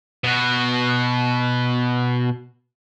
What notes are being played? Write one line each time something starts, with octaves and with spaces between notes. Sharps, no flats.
B2 F#4